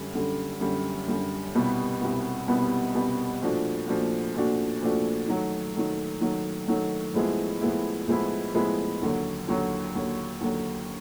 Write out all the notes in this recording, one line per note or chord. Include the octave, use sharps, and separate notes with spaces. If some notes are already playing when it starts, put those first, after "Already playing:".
Already playing: F#2 D3 G3
F#2 D3 G3
F#2 D3 G3
F#2 D3 G3
C2 B2 G3 B3
C2 B2 G3 B3
C2 B2 G3 B3
C2 B2 G3 B3
A#2 F3 A3 D4 F#4
A#2 F3 A3 D4 F#4
A#2 F3 A3 D4 F#4
A#2 F3 A3 D4 F#4
D#3 F#3 A3
D#3 F#3 A3
D#3 F#3 A3
D#3 F#3 A3
A2 F3 G#3 B3 E4
A2 F3 G#3 B3 E4
A2 F3 G#3 B3 E4
A2 F3 G#3 B3 E4
D#2 D3 F#3
D#2 D3 F#3
D#2 D3 F#3
D#2 D3 F#3